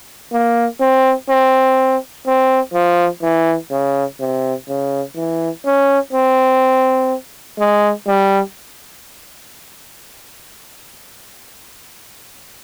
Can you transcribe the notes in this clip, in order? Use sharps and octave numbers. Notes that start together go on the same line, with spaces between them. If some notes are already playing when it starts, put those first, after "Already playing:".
A#3
C4
C4
C4
F3
E3
C#3
C3
C#3
E3
C#4
C4
G#3
G3